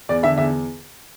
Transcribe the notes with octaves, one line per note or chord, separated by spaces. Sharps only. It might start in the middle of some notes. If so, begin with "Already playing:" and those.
E2 D5
D3 E5
E2 E5